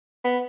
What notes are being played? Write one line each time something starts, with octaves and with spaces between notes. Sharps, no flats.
B3